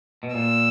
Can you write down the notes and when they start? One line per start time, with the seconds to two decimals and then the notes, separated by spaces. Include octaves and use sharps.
0.23 B2
0.34 A#2 E6